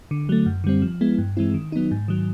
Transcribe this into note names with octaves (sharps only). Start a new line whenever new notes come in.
D3
F#3 A3
F#2
D3 G3 C4
F3
G#3 B3 E4
G2
E3 G#3 C4 E4
D#3
F#3 B3 D#4
G#2
D#3 F#3